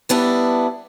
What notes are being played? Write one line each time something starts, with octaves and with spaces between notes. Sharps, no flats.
G3 B3 D4 E4